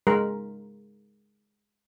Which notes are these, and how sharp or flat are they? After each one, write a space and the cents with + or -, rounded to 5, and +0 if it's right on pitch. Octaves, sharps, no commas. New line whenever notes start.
G#3 +0 A#4 +5